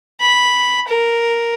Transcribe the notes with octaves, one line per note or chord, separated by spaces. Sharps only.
B5
A#4